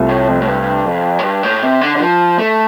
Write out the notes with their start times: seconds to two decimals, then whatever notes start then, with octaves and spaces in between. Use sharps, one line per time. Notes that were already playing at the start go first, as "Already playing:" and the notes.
Already playing: C2 C3 A3 F4
0.09 A2
0.28 F2
0.41 A2
0.47 G2
0.85 F2
1.19 A2
1.23 G2
1.43 A2
1.63 C3
1.81 D3
1.96 D3
2.00 F3
2.39 A3